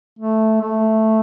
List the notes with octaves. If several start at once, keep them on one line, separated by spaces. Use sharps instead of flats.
A3
A3